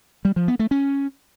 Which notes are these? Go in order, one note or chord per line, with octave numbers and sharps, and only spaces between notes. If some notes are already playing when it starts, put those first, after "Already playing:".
G3
F3
B3
A3
C#4